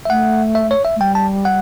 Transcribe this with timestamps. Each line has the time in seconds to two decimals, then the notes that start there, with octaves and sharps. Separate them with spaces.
0.05 E5
0.10 A3 F#5
0.55 E5
0.71 C#5
0.85 E5
0.96 A3
1.00 G3 G5
1.15 A5
1.45 F#5